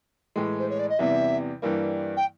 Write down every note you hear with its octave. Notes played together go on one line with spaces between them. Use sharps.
A2 E3 G#3
C5
C#5
D5
D#5
E2 C3 E3 G3 E5
G2 E3 G3 A#3
G5